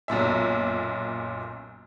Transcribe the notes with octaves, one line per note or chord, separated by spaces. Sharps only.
B1 F#2 A#2 E5